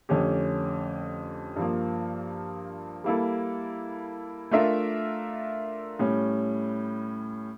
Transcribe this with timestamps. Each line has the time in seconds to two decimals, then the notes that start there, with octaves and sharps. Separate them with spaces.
0.09 F2 D3 A3 C#4 G4
1.56 G2 F3 A#3
3.04 G3 A#3 E4 A4
4.51 A3 D4 F4 A#4 E5
5.99 A2 G3 C#4